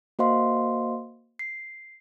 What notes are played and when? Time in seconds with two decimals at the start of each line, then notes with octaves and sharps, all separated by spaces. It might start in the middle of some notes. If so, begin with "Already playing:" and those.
0.19 A#3 F#4 C5 D#5 F5 C6
1.39 C7